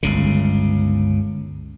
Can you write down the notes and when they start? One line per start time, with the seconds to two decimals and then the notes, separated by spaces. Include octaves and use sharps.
0.03 G1 C#2 C#3